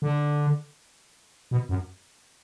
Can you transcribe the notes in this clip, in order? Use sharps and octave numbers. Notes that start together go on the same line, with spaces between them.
D3
B2
F#2